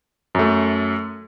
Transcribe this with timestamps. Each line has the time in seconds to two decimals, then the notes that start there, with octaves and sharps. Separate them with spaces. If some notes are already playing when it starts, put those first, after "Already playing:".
0.35 F#2 A3